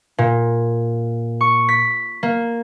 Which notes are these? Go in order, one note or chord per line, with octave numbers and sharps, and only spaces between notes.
A#2
C#6
B6
A#3